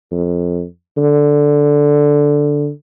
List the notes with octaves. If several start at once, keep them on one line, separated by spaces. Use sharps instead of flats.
F2
D3